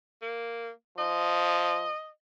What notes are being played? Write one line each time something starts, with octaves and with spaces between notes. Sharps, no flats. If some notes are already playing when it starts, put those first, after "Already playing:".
A#3
F3 D#5